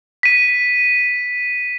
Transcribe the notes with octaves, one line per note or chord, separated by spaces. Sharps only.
B6 D#7